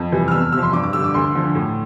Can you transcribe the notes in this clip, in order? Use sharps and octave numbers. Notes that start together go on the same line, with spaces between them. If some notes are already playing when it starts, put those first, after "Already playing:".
Already playing: F2
C3 E3 G3
F6
E2 E6
F6
C3 F3 E6
C6
G2 D6
D6
D3 G3 E6
D6
D2 C6
D3 F3
A2